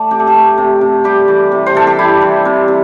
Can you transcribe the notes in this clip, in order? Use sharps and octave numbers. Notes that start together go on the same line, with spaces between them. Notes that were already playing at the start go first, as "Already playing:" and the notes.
Already playing: A3 D5
C3 G4
A4
G4
A3
C3
C3
G3 G4
E3
C3
C5
C3 A4
G4
G3 E4
E3
C3
C3